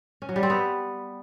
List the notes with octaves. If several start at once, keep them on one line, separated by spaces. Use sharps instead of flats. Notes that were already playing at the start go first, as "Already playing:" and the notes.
C#4
F#3
G3
C4
B3